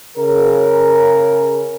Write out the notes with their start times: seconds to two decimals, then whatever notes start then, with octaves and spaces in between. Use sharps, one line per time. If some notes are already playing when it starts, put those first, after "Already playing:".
0.17 C#3 A#4